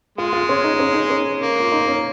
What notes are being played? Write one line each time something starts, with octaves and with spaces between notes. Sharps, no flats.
G#3 F4
F4
C#4
D#4
C#4
D#4
C#4
A#3
F4
D#4
C#4